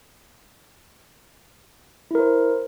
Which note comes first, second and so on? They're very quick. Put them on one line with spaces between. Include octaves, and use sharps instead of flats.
E4 A#4 C5